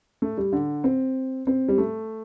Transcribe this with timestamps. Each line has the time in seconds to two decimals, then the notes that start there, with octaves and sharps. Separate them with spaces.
0.22 A3
0.38 G3
0.52 D3
0.84 C4
1.47 C4
1.68 G3
1.78 A3